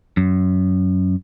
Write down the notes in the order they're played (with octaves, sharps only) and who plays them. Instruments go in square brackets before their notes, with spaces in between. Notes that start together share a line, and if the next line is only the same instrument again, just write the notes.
[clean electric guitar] F#2